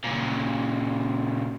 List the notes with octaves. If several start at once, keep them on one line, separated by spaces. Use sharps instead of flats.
A#2 C#3